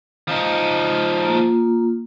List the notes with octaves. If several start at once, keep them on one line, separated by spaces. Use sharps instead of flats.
F3 D#4
A#3 F4